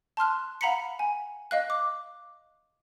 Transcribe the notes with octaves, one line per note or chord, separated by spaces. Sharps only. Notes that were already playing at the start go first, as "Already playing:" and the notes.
A5 C6 F6 F#6
F5 F#5 A#5 B5 B6 C#7
G#5
D#5 F5 F#6
D6